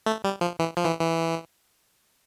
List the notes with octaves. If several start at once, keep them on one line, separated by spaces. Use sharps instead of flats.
A3
G3
F3
E3
F3
E3
E3